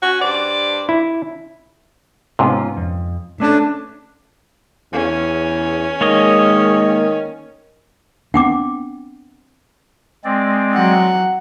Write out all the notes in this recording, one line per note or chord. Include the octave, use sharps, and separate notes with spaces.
C#4 F#4
G2 C5 D5
E4
G#2 C3 B3 C#4 F4
F2
A3 C#4 D4 A4
E2 C#4
D#3 G#3 A#3 C#5 D#5
B3 C4 D4 F#5 G5 D6
G#3 C4 D5
F#3 F#5